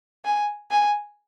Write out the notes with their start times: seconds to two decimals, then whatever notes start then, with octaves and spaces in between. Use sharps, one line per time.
0.25 G#5
0.71 G#5